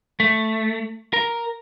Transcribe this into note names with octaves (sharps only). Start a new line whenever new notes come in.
A3
A#4